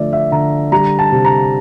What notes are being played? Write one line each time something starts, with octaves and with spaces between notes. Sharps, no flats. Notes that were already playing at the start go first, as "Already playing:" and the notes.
Already playing: D3 F3 A3 D5 E5
E5
D3 A#5
G3 A#5
A5
C3
A#5